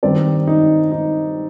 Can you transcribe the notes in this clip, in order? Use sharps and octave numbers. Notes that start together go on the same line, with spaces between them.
G2 D#3 G3 C4 D5
D#4
D#4